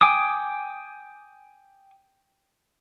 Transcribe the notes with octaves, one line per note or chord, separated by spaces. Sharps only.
G5 G#5 D6 D#6